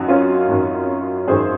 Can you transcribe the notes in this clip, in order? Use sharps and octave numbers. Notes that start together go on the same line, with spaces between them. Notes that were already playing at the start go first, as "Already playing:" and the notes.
Already playing: F#2 D#3 D#4 F#4
C#4 F4
F#2 D#3
F#2 D#3 G#4 C5